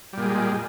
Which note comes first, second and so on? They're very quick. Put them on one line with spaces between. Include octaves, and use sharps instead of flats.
G3 A#2 G#3